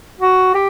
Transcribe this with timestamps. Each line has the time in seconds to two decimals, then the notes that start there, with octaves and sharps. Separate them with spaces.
0.19 F#4
0.54 G4